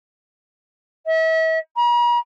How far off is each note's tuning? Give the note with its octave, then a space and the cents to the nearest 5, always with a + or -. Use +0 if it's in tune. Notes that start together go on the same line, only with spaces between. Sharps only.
E5 -40
A#5 +45